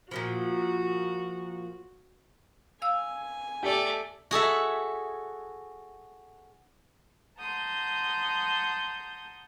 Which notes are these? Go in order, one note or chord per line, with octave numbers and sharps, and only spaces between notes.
A#2 C#3 F3 F#4
F5 G#5 E6
A3 G4 D5
F#4 G#4 A4 E5
F#5 A5 A#5 C6 D#6 G6